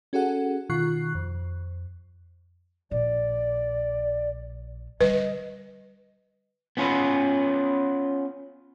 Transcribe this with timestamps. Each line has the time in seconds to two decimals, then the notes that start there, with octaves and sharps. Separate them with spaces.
0.13 C#4 F#4 G#4 A4 F#5
0.69 B2 D#3 F4 C#6 F#6 C7
1.15 F2
2.91 A#1 D5
5.01 D3 G3 B4 D#5
6.77 B3 C#4 F4 G4 B4